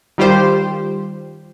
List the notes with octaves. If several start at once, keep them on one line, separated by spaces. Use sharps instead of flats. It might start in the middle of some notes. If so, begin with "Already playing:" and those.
D#3 G3 F4 G4 C5